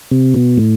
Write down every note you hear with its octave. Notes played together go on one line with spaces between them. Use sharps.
C3
B2
A2